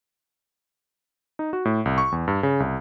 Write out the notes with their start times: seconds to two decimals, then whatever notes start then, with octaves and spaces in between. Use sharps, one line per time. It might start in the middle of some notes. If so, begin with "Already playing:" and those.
1.39 D#4
1.53 F#4
1.65 A2
1.85 C2
1.98 C#6
2.12 E2
2.28 G2
2.43 C#3
2.60 C2